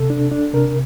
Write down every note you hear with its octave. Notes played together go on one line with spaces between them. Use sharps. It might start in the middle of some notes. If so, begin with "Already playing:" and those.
Already playing: C3 A4
D4
D4
C3 A#4